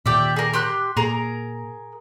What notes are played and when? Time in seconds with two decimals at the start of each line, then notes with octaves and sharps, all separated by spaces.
0.06 A#2 D#3 G4 D5 E5
0.36 G#4 A#4
0.54 G4 C6 F#6
0.97 A#2 G#4 A#4 A#5